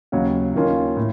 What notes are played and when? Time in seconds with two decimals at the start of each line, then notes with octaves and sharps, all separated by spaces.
0.12 D#2 C#3 F#3
0.54 D#2 D#3 A#3 C#4 F4
0.97 A2